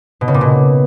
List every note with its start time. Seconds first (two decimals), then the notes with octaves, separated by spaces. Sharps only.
0.21 B2
0.28 C#3
0.34 A#2
0.41 B2